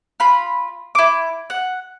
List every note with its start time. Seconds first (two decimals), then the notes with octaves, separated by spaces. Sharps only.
0.20 F4 B5
0.95 E4 D6
1.50 F#5